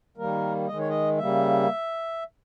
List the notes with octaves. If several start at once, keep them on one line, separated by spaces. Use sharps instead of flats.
D#3 G3 A#3 A#4
D#3 G#3 D#5
C#5
D#5
C#3 G3 A#3 E5